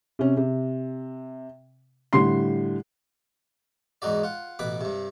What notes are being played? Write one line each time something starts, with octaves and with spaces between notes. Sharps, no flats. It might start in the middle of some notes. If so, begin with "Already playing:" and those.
C3 C#4
C3
A2 D3 G3 C6 C7
E2 G#2 D#4 F#4 D5
F4 F#5
A1 B2 B4 D6
G2 C3